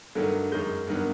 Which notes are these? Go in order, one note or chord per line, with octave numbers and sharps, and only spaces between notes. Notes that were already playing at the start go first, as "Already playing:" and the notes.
G2 D#3 F#3 A3
F#2 D#3 G#3 G6
G2 D#3 F#3 B3